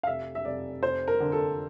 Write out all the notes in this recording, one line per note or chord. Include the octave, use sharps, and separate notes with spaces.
F5
F1 E5
E5
F1 D5
F1 C5
A#4
D3
A4